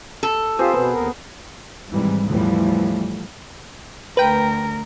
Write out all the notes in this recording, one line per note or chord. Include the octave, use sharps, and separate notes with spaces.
A4
C4 F4 G4 G#4 C5
B2 B3
D#2 A#4
G#2 C3 D#3 E3 G3
E2 A2 E3 F3 G3 A3
D2 A#4 B4 G5